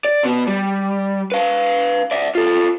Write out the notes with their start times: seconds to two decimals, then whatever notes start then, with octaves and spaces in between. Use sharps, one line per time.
0.05 D5
0.23 B2 B3
0.47 G3
1.32 B4 F5
2.11 D5 E5
2.35 F4 A4